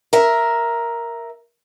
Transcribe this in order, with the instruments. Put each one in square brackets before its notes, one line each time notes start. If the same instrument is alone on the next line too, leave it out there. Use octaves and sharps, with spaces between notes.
[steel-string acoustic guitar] A#4 E5